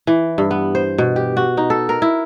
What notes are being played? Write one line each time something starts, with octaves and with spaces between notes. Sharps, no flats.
E3
G2
B3
C5
B2
G4
F#4
D#4
A4
A#4
E4